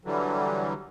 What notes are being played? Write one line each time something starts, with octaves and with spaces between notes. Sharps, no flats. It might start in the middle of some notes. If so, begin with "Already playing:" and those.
D3 E3 F#3 G3